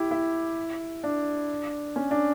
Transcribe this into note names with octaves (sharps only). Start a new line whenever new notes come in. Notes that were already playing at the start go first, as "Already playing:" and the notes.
Already playing: E4 G4
E4
D4
C#4
D4